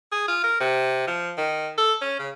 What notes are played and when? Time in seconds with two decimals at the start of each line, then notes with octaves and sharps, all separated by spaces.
0.12 G#4
0.28 F4
0.44 A#4
0.60 C3
1.07 F3
1.37 D#3
1.78 A4
2.01 C#4
2.19 C#3